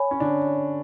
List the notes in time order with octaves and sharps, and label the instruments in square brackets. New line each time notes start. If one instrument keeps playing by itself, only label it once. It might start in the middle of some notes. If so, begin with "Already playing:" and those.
Already playing: [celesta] C#5 G#5 B5
[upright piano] C#4
D3 D4